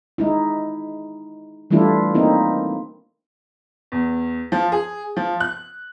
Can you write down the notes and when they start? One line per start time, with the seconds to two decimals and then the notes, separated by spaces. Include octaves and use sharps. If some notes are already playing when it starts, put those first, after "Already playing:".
0.18 G#3 D#4 E4
1.70 E3 G3 A3 D4 E4 F4
2.15 A#3 C4 D#4 E4
3.92 E2
4.52 F3
4.72 G#4
5.17 F3
5.40 F#6